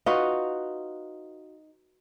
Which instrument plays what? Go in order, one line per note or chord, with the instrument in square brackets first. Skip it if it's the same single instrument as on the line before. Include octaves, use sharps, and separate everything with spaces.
[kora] D#4 F4 F#4 B4